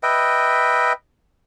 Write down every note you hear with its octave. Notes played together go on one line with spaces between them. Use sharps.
B4 D#5 E5 G5